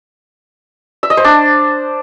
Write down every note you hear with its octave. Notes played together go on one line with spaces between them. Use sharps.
E5
D#5
C5
D4